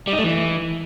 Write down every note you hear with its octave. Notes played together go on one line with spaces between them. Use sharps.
G3
D#4
A3
E3